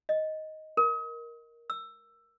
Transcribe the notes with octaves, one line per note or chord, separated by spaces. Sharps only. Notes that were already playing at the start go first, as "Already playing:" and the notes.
D#5
A#4
E6